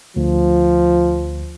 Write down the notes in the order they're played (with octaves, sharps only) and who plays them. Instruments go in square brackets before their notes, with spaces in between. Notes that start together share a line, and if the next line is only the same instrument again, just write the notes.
[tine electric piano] D2 [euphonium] F3